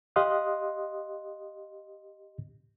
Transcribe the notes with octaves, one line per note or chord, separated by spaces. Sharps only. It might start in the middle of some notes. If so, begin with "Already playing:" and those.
G4 D#5 F5 C6 D#6 F#6